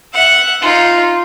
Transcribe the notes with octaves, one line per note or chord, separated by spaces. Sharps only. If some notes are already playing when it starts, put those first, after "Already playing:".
E5 F#5
D#4 F4